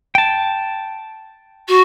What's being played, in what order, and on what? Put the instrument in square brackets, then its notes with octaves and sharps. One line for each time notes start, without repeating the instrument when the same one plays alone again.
[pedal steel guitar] G5 A5
[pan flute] F#4